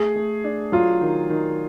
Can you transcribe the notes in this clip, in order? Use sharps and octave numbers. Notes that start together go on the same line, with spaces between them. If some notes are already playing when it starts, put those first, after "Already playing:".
Already playing: A3 G#4
A3
D4
F#3 F4
D#3
D#3